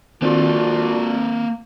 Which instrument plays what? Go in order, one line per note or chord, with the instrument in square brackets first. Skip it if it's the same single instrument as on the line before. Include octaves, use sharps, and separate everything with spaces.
[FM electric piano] D#3 C4 [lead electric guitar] A#3 A4 [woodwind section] D4 F4 F#4